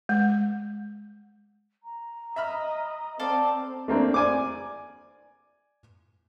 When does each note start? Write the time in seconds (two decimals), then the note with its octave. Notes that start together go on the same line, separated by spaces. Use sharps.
0.09 G#3
1.82 A#5
2.36 D#5 E5 B5 F6
3.19 C4 A4 D5 F5
3.88 A3 A#3 C4 D4
4.14 D5 G#5 D6